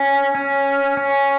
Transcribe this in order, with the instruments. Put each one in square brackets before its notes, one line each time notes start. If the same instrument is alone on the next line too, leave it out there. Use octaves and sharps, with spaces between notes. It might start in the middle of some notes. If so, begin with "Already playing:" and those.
Already playing: [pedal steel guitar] C#4
C#4
C#4